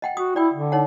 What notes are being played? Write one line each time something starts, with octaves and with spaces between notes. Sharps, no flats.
D#5 F#5 G5
F#4 D#6
E4 D5 G5
D3
D#4 C#5 F#5